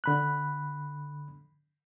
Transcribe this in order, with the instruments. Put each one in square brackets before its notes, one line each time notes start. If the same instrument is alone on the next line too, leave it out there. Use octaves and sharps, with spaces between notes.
[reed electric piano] D3 B5 F#6